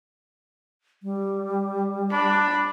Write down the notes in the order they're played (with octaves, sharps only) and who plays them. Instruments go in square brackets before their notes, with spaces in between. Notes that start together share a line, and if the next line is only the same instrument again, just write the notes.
[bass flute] G3
[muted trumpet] D4 [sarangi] B5